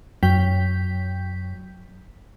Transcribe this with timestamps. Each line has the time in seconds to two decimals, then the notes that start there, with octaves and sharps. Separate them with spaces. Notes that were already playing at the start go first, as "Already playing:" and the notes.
0.23 F#2 F#3 G5 G6 B6